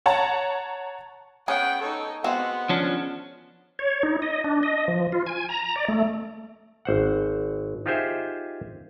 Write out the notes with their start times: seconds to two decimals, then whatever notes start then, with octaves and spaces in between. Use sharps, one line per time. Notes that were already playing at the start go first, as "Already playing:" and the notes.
0.06 C#5 F#5 A5 A#5
1.48 B3 C#4 G#4 F#5 G5
1.81 D#4 A4 C#5
2.24 G#3 B3 C4 F#4 F#5
2.69 F3 C#4 D4
3.79 C#5
4.03 D#4
4.22 D#5
4.44 D4
4.63 D#5
4.88 F3
5.12 F4
5.27 G#5
5.49 A#5
5.76 D5
5.88 A3
6.85 G#1 C5 F#5
7.86 D#4 F4 G4 G#4 C5 E5